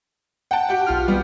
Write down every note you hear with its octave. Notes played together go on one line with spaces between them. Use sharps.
F#5 G5 A5
F#4 G4 F#5
B1 F4 F6
F3 G3 B3